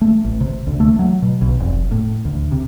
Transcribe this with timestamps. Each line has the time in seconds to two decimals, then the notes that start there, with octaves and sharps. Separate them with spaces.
0.01 A3
0.24 A1
0.41 C3
0.67 D2
0.80 A3
0.99 F#3
1.22 B2
1.42 B1
1.60 F1
1.91 A2
2.25 D2
2.52 C3